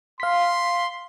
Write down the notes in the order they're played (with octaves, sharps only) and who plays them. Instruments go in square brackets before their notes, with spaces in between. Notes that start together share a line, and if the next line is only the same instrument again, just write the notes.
[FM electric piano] F5 B6 [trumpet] C6